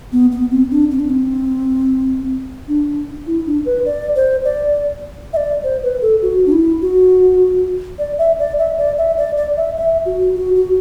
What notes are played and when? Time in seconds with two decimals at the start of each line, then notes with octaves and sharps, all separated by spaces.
0.12 B3
0.32 B3
0.51 C4
0.71 D4
0.91 C4
0.99 D4
1.10 C4
2.68 D4
3.27 E4
3.47 D4
3.66 B4
3.86 D5
4.16 C5
4.44 D5
5.33 E5
5.37 D5
5.64 C5
5.83 B4
6.02 A4
6.22 F#4
6.46 D4
6.52 E4
6.82 F#4
7.99 D5
8.18 E5
8.39 D5
8.59 E5
8.78 D5
8.98 E5
9.18 D5
9.37 D5
9.57 E5
9.77 E5
10.06 F#4
10.36 F#4
10.56 F#4